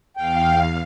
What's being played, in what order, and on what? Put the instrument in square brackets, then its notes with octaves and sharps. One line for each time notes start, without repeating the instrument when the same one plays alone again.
[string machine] E2 F5 [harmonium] G5